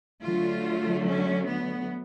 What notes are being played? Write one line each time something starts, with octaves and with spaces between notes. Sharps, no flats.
D3 F#3 A3 F4
C#4
B3